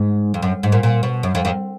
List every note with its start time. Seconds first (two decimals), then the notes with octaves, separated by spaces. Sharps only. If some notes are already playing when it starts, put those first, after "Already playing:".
Already playing: G#2
0.34 F2
0.42 F#2
0.63 G#2
0.72 A#2
0.83 A#2
1.03 B2
1.23 F#2
1.35 F2
1.45 F2